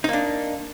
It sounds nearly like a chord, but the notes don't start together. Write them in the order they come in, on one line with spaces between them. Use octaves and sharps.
D#4 A#3 D4